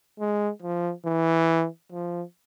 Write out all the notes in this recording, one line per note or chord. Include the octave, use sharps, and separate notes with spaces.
G#3
F3
E3
F3